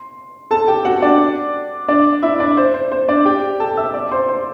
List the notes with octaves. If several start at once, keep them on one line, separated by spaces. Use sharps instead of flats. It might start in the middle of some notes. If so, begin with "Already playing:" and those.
Already playing: C6
A4 A5
G4 G5
F#4 F#5
D4 D5
D4 D5
E4 E5
D4 D5
C5
C5
C5
D4 D5
G4 G5
A4 A5
E5 E6
D5 D6
C5 C6
C5 C6